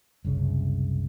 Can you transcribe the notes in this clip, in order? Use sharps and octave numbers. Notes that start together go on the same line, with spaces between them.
F#1 C2 C#3